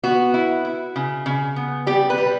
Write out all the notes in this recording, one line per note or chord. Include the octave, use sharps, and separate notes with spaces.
B3 F#4
E4
E4
C#3
C#3
B3
G3 G4
B4
G3